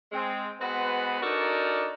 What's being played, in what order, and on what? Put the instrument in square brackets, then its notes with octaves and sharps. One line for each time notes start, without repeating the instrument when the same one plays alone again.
[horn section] G#3 C4
G#3 B3 C4 F#4 B4
D4 D#4 F#4 A4 A#4 D5